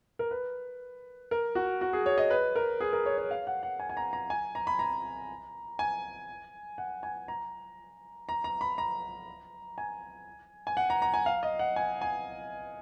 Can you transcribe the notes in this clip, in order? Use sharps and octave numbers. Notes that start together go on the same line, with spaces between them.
A#4
B4
A#4
F#4
F#4
G#4
C#5
D#5
B4
A#4
G#4
A#4
C#5
C#5
F5
F#5
F#5
G#5
G#5
A#5
A#5
G#5
A#5
B5
A#5
G#5
F#5
G#5
A#5
A#5
A#5
B5
A#5
G#5
G#5
F#5
A#5
A#5
G#5
F5
D#5
F#5
G#5
G#5